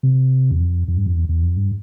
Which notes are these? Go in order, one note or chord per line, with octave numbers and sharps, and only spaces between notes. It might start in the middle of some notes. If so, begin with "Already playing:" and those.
C3
E2
F2
F2
G2
F2
E2
E2
F2
G2